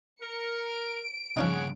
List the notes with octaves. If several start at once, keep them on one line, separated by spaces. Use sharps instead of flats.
A#4 C#7
D7
G2 C#3 F3 C#4 D#4 G#4 C#5 F#5